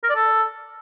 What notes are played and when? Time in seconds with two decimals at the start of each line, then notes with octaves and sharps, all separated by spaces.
0.04 A#4
0.10 D5
0.15 A4